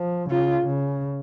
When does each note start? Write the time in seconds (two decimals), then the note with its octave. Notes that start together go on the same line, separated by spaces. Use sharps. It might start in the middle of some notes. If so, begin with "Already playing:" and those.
Already playing: F3
0.30 C#3 F4
0.66 C#3